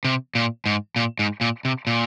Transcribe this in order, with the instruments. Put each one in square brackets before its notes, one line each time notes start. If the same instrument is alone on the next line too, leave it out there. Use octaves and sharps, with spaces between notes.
[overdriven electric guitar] C3
A#2
G#2
A#2
G#2
A#2
C3
A#2